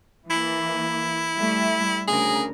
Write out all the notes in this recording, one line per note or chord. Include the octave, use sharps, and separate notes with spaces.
E3 A#3 E4
G3 A3 E5
D2 C#3 G#4 A#4